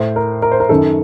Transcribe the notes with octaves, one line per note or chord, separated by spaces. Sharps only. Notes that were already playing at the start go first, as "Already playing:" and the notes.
Already playing: A2 C5
A#4
A#4
C5
A#4
F#2 D#3 A4